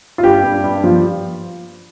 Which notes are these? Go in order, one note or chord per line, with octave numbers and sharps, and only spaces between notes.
F4
G2 G4
G2
G2
F3